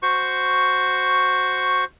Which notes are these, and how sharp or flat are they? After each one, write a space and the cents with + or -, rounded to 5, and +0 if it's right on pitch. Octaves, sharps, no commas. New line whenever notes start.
F#4 +0 C5 +0 C#6 +0